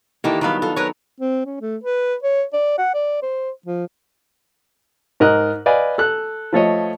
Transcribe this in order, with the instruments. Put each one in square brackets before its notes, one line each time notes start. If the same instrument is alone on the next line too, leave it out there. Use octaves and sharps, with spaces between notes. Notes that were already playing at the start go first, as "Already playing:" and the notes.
[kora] D#3 E3 D4 [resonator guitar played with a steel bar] A#3 G4 A4
[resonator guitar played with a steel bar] D#3 B4 F5 [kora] F#3 G3 B3
[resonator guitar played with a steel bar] F4 [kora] A4
[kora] F#3 [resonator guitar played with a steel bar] A#4 B4 C#5
[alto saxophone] C4
C#4
A3
B4
C#5
D5
F#5
D5
C5
F3
[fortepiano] G#2 A#4 D#5 F#6
B4 D5 D#5 F5 G#5
A4 F#6
F3 A3 C#5 D#5